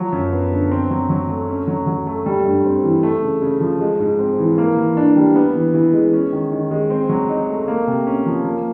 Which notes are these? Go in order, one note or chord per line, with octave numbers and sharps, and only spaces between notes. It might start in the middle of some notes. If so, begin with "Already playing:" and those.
Already playing: F3 F#3
F#2
B3
D3
C4
F#3
F#3
A3
C#4
F#3
F#3
A3
G3
G2
C4
E3
A3
C#3
C#3
F3
G#3
G#2
C4
E3
A#3
E3
D4
G3
B3
E3
E3
G#3
C#4
D#3
D#3
G#3
C4
F#3
D#4
A3
A#3
C3
C#4
F3
A#3